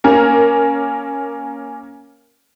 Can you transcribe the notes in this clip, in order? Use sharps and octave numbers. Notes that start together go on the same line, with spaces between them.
A#3 C#4 A#4